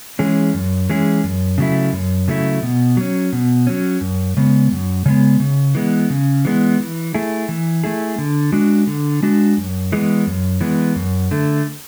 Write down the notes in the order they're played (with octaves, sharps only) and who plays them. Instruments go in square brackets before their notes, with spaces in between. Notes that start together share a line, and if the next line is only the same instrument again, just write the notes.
[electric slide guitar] E3 G#3 C#4 G#4
F#2
E3 G#3 C#4 G#4
F#2
C#3 F#3 A3 E4
F#2
C#3 F#3 A3 E4
B2
F#3 C#4
B2
F#3 C#4
F#2
C#3 G#3 B3
F#2
C#3 G#3 B3
C#3
E3 G#3 B3
C#3
E3 G#3 B3
E3
A3 E4 G#4
E3
A3 E4 G#4
D3
G#3 D4 F#4
D3
G#3 D4 F#4
F#2
E3 G#3 B3
F#2
E3 G#3 B3
F#2
D3 A3